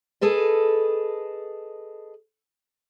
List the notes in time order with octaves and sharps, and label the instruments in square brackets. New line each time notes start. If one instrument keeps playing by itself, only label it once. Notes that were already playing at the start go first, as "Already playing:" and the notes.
[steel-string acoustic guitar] G#4 A4 B4 D#5